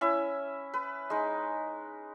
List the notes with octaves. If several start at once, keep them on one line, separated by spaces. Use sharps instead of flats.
C#4 E4 E5
B4
G#3 D#4